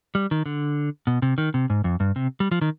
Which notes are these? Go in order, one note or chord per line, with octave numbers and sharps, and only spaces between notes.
G3
D#3
D3
B2
C3
D#3
C3
G#2
F2
G2
C3
G3
F3
D#3